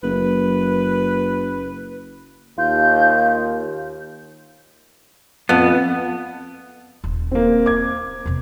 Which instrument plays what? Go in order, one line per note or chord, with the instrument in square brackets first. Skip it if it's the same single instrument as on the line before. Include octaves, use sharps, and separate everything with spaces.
[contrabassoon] F#1 [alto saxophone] B4
[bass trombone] D#2 [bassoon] F4 [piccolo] G6
[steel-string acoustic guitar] F2 [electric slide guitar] B3
[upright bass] D#1
[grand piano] A#3 C4
[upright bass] C4 [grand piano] D6 G#6
[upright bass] E2 B2